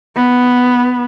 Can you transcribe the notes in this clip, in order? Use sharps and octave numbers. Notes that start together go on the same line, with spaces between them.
B3